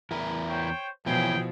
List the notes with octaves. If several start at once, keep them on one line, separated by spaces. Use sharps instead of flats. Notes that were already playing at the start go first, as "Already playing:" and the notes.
E2 E4 A#4
C5 C#5 G5
B2 E3 F3 B3 E4 G#4 C#5 G5